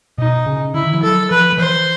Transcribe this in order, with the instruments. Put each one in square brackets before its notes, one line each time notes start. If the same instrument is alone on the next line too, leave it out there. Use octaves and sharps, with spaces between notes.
[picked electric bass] B2 [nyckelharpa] D#4
[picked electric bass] C#3
[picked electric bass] D3 [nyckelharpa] E4
[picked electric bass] D#3
F3
[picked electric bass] F#3 [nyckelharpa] A4
[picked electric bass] F3 [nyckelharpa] B4
[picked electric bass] F3
[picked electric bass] E3 [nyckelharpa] C5